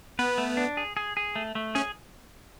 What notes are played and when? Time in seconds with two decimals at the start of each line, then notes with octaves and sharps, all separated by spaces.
0.19 B3 B4
0.38 A3
0.57 D4
0.77 G#4
0.97 G#4
1.17 G#4
1.36 A3
1.55 A3
1.75 C#4 G#4